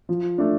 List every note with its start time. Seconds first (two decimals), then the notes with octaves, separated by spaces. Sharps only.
0.09 F3
0.38 A3 D4